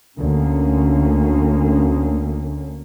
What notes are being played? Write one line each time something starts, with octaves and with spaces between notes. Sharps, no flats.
D2 A#3 C#4